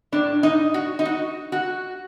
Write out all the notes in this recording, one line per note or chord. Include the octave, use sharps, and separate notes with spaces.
A2 D4
D#4
F#4
D#4
F#4
F#4